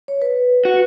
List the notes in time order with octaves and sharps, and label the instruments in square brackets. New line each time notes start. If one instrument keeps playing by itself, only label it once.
[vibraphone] C#5
B4
[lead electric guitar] F#4